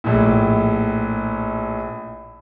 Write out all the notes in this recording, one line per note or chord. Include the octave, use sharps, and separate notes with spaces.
A#1 A2